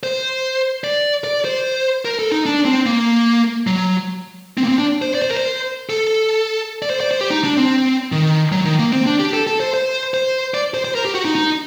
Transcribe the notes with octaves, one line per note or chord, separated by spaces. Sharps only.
C5
D5
D5
C5
A#4
A4
D#4
D4
C4
A#3
F#3
C4
A#3
C4
D4
C5
D5
C5
A#4
C5
A4
D5
C5
D5
C5
G4
D#4
D4
C4
D#3
F#3
D#3
A#3
C4
D4
G4
A4
A4
C5
C5
C5
D5
C5
C5
A#4
G4
F#4
D#4
D#4